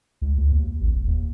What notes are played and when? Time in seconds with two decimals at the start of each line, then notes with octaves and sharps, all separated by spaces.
0.22 C#2
0.38 D2
0.52 D#2
0.81 A1
0.94 E1
1.07 D#2